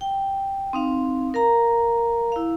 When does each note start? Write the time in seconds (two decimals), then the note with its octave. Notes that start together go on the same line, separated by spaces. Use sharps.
0.01 G5
0.73 C4 D#4 F5
1.34 A#4 F5 A#5
2.32 E4 F5